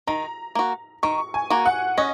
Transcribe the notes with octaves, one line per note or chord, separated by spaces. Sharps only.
D#3 A#5
A#3 F#4
D#3 C#6
G#5
A#3 F#4
F#5
C#4 D#5